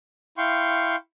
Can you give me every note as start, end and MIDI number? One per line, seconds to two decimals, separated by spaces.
0.38 0.96 64
0.38 0.96 77
0.38 0.96 79
0.38 0.96 84
0.38 0.96 85